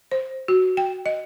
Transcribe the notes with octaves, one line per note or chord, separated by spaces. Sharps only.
C5
F#4
G5
D#5